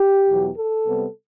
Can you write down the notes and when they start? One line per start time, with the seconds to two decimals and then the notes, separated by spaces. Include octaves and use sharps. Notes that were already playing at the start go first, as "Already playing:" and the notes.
Already playing: G4
0.29 E2 B2 F#3 B3
0.58 A4
0.86 C3 G3 B3